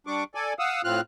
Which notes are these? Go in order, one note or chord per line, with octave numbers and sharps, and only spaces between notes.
G3 D4 C#6 D6
A4 D5 G#5
F5 F#5 D#6 E6
A2 C4 F4 F6 F#6